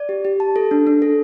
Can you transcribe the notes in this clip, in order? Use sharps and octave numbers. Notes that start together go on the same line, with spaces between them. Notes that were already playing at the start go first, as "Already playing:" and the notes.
Already playing: D5
G4
G4
A5
A4
D4
D4
A4